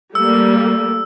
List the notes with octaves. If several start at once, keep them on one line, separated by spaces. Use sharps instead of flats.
G3 A3 A#3 E6